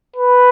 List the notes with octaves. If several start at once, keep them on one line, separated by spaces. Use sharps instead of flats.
B4